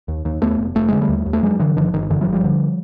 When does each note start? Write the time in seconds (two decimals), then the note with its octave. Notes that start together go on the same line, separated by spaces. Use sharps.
0.08 D#2
0.25 D#2
0.42 D#2 A3 B3
0.59 F1
0.75 F1 A3
0.88 D3 G#3
1.01 G3 A3
1.09 D#2
1.26 D#2
1.33 A3
1.43 F#2 F#3 G#3
1.59 D3 E3 F#3
1.76 G1 D#3 F3
1.93 G1 D#3
2.10 F#2 D3 E3
2.21 E3 F#3
2.27 G1
2.32 F3 G3
2.44 D3